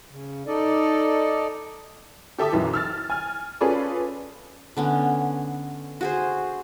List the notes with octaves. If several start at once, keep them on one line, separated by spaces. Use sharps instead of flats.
C#3
D#4 A4 D5 D#5
G4 A4 E5 A5 D6 D#6
B1 F#2 E3
E6 F6 A6
G#5 F6
C#4 F4 G#4 A4 B4 D5
D3 B3 C#4
F#4 G#4 C5